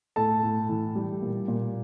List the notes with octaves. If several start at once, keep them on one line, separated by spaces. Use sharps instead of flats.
A2 A4 A5
A2
E3
G3
A#2
A#2